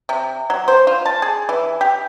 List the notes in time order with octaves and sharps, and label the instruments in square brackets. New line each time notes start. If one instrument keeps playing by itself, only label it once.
[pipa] C3
F#3
C5
F4
A5
G#4
E3
G4